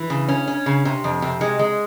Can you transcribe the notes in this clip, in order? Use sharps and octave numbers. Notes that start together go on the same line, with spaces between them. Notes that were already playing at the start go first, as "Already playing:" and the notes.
Already playing: E3
C#3
C#4
C#4
C#3
C3
F2
C3
G#3
G#3